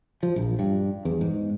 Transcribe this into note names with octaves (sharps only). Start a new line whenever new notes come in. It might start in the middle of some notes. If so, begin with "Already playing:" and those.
F3
A#1
G2
E2
G#2